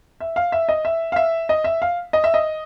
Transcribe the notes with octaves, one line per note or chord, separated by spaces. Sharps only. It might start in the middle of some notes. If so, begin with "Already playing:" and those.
E5
F5
E5
D#5
E5
F5
E5
D#5
E5
F5
D#5
E5
D#5